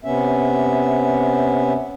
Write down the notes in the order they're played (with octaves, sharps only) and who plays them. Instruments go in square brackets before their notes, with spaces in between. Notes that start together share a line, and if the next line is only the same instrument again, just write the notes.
[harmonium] C3 B3 C#4 E5